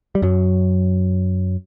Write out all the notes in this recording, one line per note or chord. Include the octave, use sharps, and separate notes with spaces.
G3
F#2 F#3